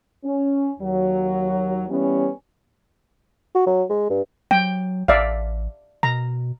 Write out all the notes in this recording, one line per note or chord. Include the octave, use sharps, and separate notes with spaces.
C#4
D#2 F#3
E3 G3 B3 C#4
F#4
F#3
G#3
G2
F#3 G5
A1 D5 E5 F5
B2 A#5